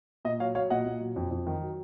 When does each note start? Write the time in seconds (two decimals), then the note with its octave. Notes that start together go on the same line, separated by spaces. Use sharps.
0.25 A#2 D#5
0.39 F#3 C#5 F5
0.55 F#3 C#5 F5
0.70 A#2 D#5 F#5
0.86 A#2
1.00 F#3
1.16 F2
1.31 F2
1.47 D#3
1.61 F#3